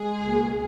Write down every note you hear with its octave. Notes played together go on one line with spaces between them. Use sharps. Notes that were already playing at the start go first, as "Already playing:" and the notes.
Already playing: G#3 G#4
C#2 B2 A#3